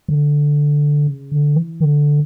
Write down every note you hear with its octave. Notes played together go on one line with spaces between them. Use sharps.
D3
C#3
D3
E3
D3